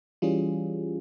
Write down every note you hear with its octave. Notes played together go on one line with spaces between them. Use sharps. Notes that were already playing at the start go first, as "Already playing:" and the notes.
E3 G3 C#4 F4 G#4